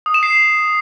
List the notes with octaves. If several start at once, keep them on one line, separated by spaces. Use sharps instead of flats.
D#6
E7
C7